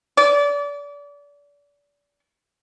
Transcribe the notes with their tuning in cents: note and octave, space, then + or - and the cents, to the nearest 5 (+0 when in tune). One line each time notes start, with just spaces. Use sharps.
D5 -30